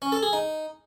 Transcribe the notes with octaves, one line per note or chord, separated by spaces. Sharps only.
C#4
A4
G#4
D#4